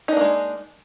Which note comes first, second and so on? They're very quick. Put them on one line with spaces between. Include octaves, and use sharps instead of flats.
D#4 D4 A#3 G#3